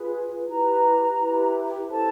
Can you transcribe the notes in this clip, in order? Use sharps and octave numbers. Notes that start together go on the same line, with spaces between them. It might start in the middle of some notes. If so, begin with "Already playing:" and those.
Already playing: F4 G#4 B4
E4 G4 B4 A#5
E4 G4 B4
C#4 E4 A4 C5 A5